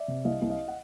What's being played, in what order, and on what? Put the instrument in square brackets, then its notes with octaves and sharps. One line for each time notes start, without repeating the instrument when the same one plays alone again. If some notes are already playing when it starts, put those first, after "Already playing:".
Already playing: [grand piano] D5 E5
C3
C2 D#5 F5
C2
D#5 F5
F#5